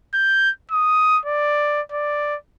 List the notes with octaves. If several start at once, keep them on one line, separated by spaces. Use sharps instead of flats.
G6
D#6
D5
D5